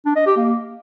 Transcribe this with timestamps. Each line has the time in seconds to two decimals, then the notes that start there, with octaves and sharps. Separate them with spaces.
0.06 D4
0.16 D#5
0.26 G4
0.37 A#3